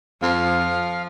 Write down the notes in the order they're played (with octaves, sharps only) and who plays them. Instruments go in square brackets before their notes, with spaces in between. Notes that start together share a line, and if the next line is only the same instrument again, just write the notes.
[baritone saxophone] F2 [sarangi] F3 [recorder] F5